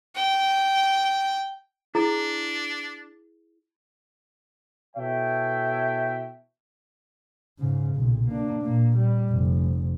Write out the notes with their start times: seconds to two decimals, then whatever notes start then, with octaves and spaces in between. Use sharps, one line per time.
0.16 G5
1.95 D4 E4 G#4
4.96 B2 E3 A4 C#5 E5 G5
7.59 G#2 C#3
7.95 B1 A#2
8.27 A#3 D4
8.63 A#2 A#3
8.97 G3
9.32 F1